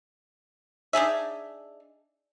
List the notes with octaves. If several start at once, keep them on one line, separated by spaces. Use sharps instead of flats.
D4 D#4 G#4 E5